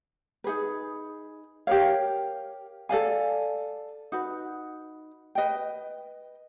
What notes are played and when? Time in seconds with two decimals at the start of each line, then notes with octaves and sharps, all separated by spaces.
0.44 D#4 G#4 B4
1.67 G4 A#4 C#5 F5
2.89 A4 D5 F5 G#5
4.12 D#4 F#4 B4
5.35 B4 D#5 G5